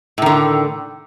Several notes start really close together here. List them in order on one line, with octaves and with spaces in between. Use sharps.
A2 D#3 D3